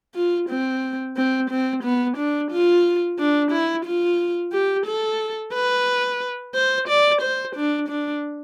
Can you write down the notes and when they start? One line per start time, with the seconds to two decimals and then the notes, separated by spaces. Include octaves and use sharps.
0.15 F4
0.50 C4
1.17 C4
1.50 C4
1.84 B3
2.18 D4
2.51 F4
3.19 D4
3.52 E4
3.86 F4
4.53 G4
4.86 A4
5.54 B4
6.55 C5
6.88 D5
7.22 C5
7.56 D4
7.89 D4